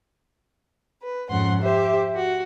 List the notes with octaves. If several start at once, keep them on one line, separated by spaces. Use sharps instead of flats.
B4
F2 G#2 C#4 F#5 C6
G4 C5 E5
F#4